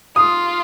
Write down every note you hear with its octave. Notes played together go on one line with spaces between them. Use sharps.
F4 D#6